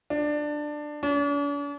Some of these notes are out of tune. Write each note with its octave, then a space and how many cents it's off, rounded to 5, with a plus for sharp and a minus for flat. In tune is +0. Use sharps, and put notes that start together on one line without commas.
D4 +15
D4 -45